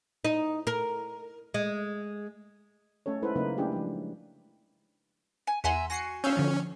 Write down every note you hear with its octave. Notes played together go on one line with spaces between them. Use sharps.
D#4
A#4
G#3
A3 C#4 A4 C#5
G#3 D#4 E4 A4 B4 C5
C#3 F#3 A#3 D#4 B4
A3 C#4 D4 E4 G4 G#4
F3 G#3
G#5
E2 E5 F#5 G#5 A#5 C6
F#4 G#5 A#6 C7 C#7
C#4 F5 E6 G6
D3 F3